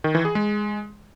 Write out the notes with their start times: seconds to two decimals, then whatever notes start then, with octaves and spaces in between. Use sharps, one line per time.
0.04 D#3
0.15 E3
0.25 G#4
0.35 G#3